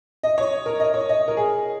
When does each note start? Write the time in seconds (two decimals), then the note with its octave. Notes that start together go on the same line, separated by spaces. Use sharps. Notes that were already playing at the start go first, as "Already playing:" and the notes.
0.23 D#5
0.38 C#5
0.66 A#4
0.80 D#5
0.94 C#5
1.09 D#5
1.28 A#4
1.37 G#4